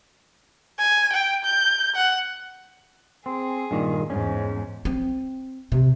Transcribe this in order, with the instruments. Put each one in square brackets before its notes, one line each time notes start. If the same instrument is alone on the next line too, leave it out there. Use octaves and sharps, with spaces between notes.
[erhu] G#5
G5
G6
F#5
[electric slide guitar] C4 [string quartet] G#4
[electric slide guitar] G2 A#2 D#3
[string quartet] E2 G#2 [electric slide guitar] C#4
[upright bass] C4
C3